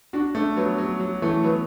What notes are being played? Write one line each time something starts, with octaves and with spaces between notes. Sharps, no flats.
D4 F#4
A3 D4
F#3 B3
F#3
F#3
E3 A3
F#3 B3